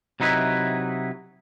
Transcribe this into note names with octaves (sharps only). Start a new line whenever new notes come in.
C3 F#3 D#4 E4 B4